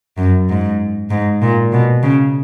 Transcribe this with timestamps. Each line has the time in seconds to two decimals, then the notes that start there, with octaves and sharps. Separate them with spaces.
0.17 F#2
0.49 G#2
1.10 G#2
1.42 A#2
1.72 B2
2.03 C#3